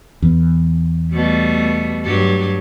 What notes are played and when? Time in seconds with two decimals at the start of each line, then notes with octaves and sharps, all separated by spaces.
0.22 E2
1.13 B2 G3 A3
2.05 G2 F#3 G4